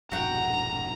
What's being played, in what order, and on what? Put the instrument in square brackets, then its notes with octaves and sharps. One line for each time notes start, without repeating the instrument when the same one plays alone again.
[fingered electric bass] E1 A#1 G2 [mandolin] F#4 F#5 G5 [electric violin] A#5